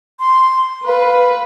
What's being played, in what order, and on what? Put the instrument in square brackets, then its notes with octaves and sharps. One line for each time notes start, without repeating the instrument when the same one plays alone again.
[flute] C6
[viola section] B4 [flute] F5